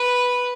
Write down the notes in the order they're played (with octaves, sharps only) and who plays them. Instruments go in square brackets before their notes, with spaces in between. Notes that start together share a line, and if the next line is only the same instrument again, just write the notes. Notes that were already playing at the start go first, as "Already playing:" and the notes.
Already playing: [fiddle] B4